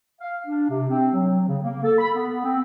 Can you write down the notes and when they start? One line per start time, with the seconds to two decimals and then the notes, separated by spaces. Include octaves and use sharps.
0.20 F5
0.47 D4
0.69 C3
0.89 C4
1.14 F#3
1.47 C#3
1.63 A#3
1.84 A4
1.99 B5
2.14 B3
2.44 C4